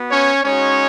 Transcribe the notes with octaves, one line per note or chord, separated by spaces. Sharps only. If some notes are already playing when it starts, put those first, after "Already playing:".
Already playing: B3 F#4
C#4 C#5
G#3 C#4 D#4 F#4 C#5